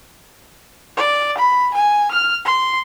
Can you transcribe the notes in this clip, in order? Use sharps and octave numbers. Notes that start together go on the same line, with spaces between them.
D5
B5
G#5
F6
C6